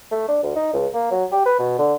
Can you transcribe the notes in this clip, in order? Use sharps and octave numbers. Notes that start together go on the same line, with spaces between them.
A3
D4
D2
D#4
C#2
A#3
F#3
G4
B4
B2
D3